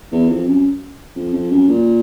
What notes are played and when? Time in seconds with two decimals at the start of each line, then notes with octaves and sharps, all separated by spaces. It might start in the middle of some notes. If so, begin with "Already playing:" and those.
0.12 E2
0.29 F2
0.47 F#2
1.16 F2
1.33 F2
1.51 F#2
1.69 A#2